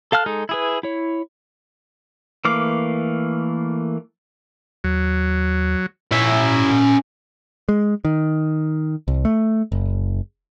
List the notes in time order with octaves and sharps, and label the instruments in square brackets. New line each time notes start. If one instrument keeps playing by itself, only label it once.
[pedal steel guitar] A4 F5 A5 F6 F#6
G#3 D#4 A4
E4 G#4 B4
E4 C#5
E3 A3 A#3 F5 D6
[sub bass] D#2 [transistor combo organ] F#3
[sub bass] A#2 [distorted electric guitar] C#4 E5 [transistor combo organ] E4
[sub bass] A#2
[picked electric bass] G#3
D#3
C2
A3
F#1